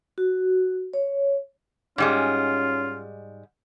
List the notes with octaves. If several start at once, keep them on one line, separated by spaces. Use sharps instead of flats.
F#4
C#5
G#2 G3 G#3 C#4 F4